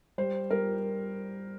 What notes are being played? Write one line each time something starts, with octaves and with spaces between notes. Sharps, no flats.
G3 C5
G3 A#4